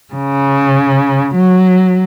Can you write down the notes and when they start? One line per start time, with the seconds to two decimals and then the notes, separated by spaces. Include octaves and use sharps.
0.14 C#3
1.35 F#3